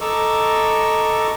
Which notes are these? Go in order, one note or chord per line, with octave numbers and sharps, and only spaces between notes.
A4 D#5 A#5 C#6 D6 E6